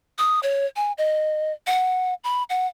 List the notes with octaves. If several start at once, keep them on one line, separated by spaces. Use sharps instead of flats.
D#6
C#5
G#5
D#5
F#5
B5
F#5